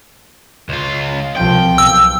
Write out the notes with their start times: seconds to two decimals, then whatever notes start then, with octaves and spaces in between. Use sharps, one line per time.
0.69 C#2 F4
1.36 C2 F3 G5
1.78 B1 E6